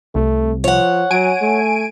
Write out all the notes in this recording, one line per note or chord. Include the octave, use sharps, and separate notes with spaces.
C2 A3
F3 C#5 F#5
F#3 G#5 D7 D#7
A3